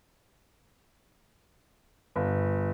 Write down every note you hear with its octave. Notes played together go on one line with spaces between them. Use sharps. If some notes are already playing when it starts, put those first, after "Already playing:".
G1